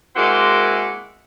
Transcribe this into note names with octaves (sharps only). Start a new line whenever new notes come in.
G#3 A#3 C4 E4 F#4